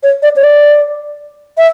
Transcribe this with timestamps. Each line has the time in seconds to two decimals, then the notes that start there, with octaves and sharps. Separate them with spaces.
0.03 C#5
0.23 D5
0.36 C#5
0.44 D5
1.58 E5